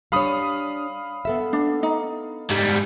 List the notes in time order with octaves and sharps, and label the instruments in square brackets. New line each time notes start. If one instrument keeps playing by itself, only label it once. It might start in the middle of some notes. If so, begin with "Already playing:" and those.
[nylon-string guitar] G3 D4 C#5 [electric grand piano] F5 B5 D#6
[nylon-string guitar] B3 A4 E5
[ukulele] D4
D#4
[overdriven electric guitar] G#2 G3